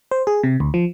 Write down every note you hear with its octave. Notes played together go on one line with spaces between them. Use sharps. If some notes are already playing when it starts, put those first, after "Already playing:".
C5
G#4
C3
D2
F3